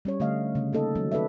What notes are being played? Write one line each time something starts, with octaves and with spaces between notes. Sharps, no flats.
G3 C#4 C#5
D3 A3 D#5 F5
C#3 A3
A#3 D#4 A4 D#5
D#3 F#3 G3 C#4
D#4 A4 B4 D5 E5